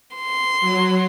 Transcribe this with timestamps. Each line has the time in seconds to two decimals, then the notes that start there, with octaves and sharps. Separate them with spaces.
0.18 C6
0.60 F#3